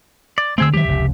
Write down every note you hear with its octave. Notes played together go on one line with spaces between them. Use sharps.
D5
D3 A3 C4 G#4 E6
D#3 F#3 G#3 G4 E5
F1 C#2